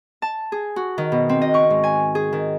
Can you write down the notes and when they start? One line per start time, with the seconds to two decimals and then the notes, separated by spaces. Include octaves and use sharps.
0.22 A5
0.52 G#4
0.76 F#4
0.98 D#3
1.12 B2
1.29 C4
1.41 D#5
1.54 C#6
1.70 G#2
1.84 G#5
2.15 G#4
2.33 D#3